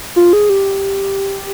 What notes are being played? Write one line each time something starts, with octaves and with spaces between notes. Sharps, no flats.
F4
G#4
G4